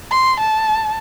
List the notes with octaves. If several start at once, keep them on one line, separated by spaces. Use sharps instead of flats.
C6
A5